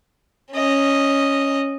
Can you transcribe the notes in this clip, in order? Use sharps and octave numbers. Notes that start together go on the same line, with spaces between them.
C#4 D#5